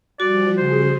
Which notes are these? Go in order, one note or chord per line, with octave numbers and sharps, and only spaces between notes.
F3 G3 F#4 D5
C#3 G#4 C5